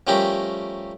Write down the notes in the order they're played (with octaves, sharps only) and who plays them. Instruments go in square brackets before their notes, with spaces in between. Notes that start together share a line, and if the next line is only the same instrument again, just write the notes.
[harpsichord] F3 G3 A3 C#4 G4 A#4